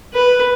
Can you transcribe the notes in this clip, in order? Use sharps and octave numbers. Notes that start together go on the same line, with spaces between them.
B4